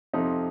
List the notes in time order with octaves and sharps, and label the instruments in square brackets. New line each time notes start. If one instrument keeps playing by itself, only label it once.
[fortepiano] F2 C3 F3 D#4